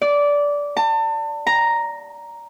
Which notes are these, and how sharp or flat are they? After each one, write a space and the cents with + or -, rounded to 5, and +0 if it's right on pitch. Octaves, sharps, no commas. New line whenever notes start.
D5 -15
A5 +35
A#5 +0